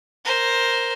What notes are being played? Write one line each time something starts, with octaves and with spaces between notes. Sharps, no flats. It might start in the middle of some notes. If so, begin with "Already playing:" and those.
A#4 C5